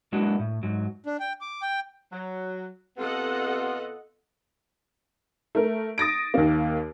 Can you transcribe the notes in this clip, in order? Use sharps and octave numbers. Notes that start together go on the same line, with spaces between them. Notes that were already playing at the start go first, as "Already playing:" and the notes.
F#3 G#3 A#3 D4 E4 F#4
A2
G#2 F#3
D4
G5
D6
G5
F#3
C3 B3 F4 A4 D#5 F#5
A3 A#4
D#6 A6 A#6 D7
D#2 A#3